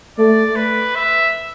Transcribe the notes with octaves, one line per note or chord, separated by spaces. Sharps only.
A3 D5
B4
E5